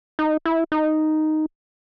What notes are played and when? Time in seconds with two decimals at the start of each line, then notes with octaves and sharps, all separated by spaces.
0.19 D#4
0.45 E4
0.72 D#4